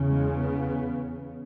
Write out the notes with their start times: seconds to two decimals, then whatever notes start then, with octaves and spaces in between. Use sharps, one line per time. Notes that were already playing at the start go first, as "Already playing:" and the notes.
Already playing: E2 C#3
0.12 G#3
0.42 B3